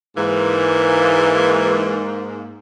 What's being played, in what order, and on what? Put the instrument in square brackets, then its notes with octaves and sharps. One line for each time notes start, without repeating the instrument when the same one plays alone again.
[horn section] G#2 A#3 [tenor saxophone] E3